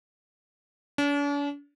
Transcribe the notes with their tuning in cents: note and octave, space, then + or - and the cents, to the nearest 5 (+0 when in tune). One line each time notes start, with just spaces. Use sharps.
D4 -45